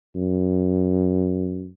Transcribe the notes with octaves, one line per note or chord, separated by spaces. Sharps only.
F#2